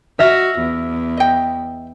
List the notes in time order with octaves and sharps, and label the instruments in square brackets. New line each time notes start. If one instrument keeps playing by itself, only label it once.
[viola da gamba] F#4 [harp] E5 F6 A#6
[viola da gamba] E2
[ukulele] D#5 G5